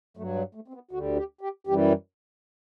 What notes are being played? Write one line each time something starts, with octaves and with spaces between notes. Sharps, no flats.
G2 F#3 A3
G3
A3
C4
B3
D2 D3 G3 F#4
G4
G4
F#2 E3 G3 G4